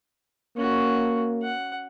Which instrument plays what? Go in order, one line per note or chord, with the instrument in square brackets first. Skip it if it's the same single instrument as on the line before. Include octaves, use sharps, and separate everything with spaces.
[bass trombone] A#3 [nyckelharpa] C#4 F#4
[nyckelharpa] F#5